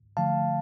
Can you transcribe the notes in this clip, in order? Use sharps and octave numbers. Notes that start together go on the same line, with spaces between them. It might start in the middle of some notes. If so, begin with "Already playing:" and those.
D3 F3 A3 F5 A5